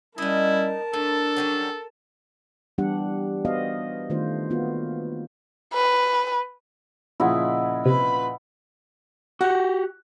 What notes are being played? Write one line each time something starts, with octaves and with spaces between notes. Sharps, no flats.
G3 C#4 D#4 E4 A#4 D#5 A5
A2 D4 A4
F#3 G3 C#4
E3 G3 B3 D4 G4 F#5
B3 F#4 C5 D#5 F5
D#3 A3 D4 F4 C5
A#3 B3 F4 F#4
B4
A#2 C#3 F3 E4 D#5 F#5
C3 B4 B5
F#4 G4 F#5